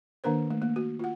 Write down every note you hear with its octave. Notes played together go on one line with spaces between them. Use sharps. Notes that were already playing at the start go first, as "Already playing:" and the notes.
D#3 A#3 D4 A#4 C5
A3
A#3
F#4
F4 F#5